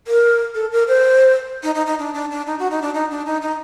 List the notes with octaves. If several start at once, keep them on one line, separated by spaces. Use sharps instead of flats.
A#4
A4
A#4
C5
D#4
D#4
D#4
D4
D4
D4
D#4
F#4
D#4
D4
D#4
D4
D#4
D#4